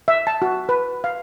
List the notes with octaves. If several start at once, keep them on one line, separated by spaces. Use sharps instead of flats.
E5
A5
F#4
B4
F5